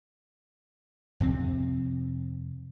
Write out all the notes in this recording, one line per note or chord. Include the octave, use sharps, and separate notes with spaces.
F2 C3 C4